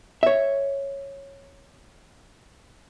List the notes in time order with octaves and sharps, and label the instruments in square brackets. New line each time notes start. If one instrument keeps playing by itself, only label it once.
[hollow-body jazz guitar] C#5 E5